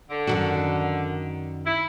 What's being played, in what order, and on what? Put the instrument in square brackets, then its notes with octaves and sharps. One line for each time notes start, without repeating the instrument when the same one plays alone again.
[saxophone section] D3
[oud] F#2 D#3 F#4
[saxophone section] E4